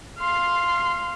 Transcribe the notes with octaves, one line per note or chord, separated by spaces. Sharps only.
F5 C6